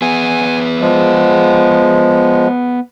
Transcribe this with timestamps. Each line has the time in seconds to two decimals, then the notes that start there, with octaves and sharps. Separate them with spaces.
0.02 B3 G#4 G#5
0.81 F3 G#3